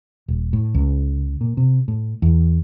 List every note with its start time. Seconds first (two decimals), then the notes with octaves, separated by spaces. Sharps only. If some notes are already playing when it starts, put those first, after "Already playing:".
0.28 D#1
0.53 A2
0.75 C#2
1.41 A#2
1.57 C3
1.88 A2
2.22 E2